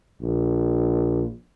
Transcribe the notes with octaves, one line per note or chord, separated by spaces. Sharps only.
A#1